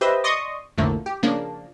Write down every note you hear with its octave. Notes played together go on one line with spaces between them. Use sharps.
G4 B4 C5 D#5 E5
D5 D#5 C6 C#6 D#6
B1 F2 A2 D3 A3 A#3
G4
C#3 F3 A#3 D4